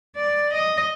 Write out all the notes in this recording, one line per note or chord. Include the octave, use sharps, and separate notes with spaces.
D5
D#5